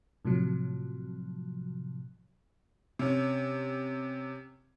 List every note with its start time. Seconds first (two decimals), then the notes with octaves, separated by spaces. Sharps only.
0.25 A2 C3 F3 F#3
2.99 C3 C#4